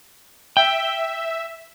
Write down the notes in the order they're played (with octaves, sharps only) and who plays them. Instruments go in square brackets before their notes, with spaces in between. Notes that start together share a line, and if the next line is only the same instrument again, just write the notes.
[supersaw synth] E5 [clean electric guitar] G5